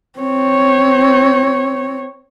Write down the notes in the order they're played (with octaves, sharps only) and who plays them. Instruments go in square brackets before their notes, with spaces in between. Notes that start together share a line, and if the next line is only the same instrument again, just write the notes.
[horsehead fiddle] C4 C#5